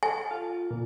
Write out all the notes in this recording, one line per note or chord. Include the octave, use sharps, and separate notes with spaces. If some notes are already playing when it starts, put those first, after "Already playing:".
A4 G#5
F4
A#2